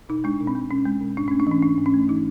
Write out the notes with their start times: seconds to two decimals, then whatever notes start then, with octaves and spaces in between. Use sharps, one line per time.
0.09 B2 D#4
0.24 G#3 D4
0.40 B2
0.47 C4
0.55 G#3
0.70 B2 C#4
0.86 G#3
1.01 B2
1.17 G#2 D4
1.28 C#4
1.31 A3
1.40 D4
1.47 E3 C#4
1.62 G#2 D4
1.78 G#2
1.86 C#4
1.94 A3
2.08 E3 D#4